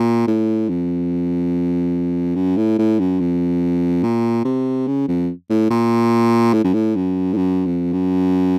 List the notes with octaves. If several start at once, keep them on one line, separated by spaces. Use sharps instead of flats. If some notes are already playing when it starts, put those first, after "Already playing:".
Already playing: A#2
A2
F2
F#2
A2
A2
F#2
F2
A#2
C3
C#3
F2
A2
A#2
A2
F#2
A2
F#2
A2
F#2
F2
F#2